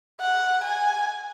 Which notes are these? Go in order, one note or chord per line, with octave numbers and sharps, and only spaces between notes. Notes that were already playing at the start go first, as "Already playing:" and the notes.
F#5
G#5